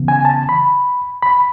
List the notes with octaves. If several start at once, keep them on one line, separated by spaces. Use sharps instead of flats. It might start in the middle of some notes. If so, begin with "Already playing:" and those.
Already playing: C#3 E3 B3
G#5
A5
B5
B5